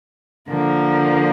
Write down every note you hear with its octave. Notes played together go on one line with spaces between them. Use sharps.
D3 F3 A#3